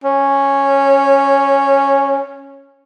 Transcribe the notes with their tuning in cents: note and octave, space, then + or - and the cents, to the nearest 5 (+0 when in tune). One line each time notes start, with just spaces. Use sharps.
C#4 -10